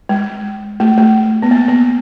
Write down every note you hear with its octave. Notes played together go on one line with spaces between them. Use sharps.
G#3
A3
A3
B3
A#3
B3